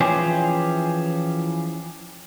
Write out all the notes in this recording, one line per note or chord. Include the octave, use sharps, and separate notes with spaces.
E3 F3 C#4 G4 G#4 C5